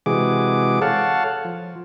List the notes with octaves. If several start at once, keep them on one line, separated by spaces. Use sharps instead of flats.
C3 E3 G#3 F#4 G#4 D6
A4 C#5 F5 F#5 A5
F3